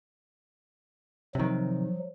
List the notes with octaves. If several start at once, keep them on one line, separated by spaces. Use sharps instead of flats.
C3 D#3 F3 F#3